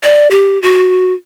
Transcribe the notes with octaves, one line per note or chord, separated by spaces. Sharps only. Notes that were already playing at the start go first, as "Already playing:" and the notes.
D5
G4
F#4